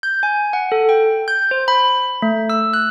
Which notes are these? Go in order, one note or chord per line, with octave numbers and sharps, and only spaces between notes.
G6
G#5
F#5
A4
G5
G6
C5
B5
A3
E6
F#6